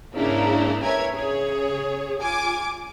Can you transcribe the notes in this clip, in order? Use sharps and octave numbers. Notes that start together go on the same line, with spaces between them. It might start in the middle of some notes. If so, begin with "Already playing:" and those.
G#2 C#3 A#3 D4 E4
A#4 B4 C#5 E5 G#5 G#6
C#3 G#4 C#5
F4 G#5 D6